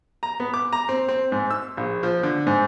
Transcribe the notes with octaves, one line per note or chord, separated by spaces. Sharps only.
A#5
B3
D6
A#5
C4
C4
G#2
E6
A#1
F3
D3
G#2